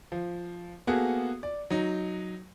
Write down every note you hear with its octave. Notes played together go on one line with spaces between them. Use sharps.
F3
A#3 B3 F#4 G#4 A4
D5
F#3 D#4